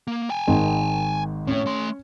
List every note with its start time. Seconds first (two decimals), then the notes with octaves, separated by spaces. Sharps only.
0.07 A#3
0.30 G5 G#5
0.47 G#1 D#3 G#3
1.47 A2 C#4 C#5
1.66 A3 C6